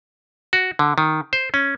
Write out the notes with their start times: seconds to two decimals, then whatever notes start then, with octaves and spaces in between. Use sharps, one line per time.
0.53 F#4
0.79 D3
0.98 D#3
1.33 C5
1.54 C#4